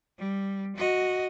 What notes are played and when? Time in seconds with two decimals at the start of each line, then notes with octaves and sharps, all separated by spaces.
0.18 G3
0.76 F#4 D#5